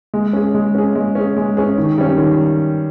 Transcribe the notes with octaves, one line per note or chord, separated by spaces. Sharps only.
G#3
C#4 G#4
G#3
C#4 G#4
G#3
C#4 G#4
G#3
C#4 G#4
D#3
G3 C#4
D#3